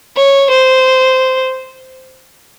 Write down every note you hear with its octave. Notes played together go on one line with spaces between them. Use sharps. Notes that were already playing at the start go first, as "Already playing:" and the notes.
C#5
C5